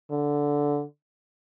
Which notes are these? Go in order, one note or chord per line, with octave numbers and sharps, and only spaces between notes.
D3